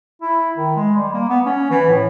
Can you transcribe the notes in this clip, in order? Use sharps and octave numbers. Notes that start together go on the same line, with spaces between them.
E4
D#3
G#3
G3
A#3
B3
C#4
E3
A2